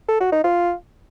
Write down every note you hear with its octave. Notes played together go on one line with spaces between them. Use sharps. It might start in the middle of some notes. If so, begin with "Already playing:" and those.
A4
F#4
D#4
F4